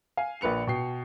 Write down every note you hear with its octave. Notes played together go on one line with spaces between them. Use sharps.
F5 G#5
A#1 A#2 B4 C#7 F7
B2 G5 C7